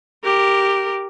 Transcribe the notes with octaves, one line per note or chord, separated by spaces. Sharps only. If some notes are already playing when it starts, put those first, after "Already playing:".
G4 A#4